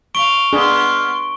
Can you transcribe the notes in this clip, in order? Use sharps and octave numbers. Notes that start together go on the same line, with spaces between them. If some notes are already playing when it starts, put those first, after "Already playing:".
F5 C#6 D7 G7
G#3 B3 D4 E4 G#4 C6 F6